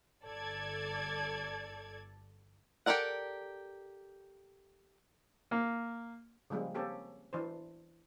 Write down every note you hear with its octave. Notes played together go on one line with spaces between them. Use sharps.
G1 A4 D5 G#6
G4 A4 A#4 D5 F#5
A#3
C#3 F3 G3 G#3 A#3
A#3 C4 C#4 G4 A4
E3 D4 C5